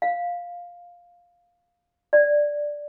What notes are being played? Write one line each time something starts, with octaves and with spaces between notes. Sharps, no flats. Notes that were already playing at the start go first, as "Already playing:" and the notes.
F5
D5